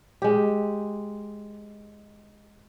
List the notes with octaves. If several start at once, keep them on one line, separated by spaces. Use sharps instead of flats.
G#3 G4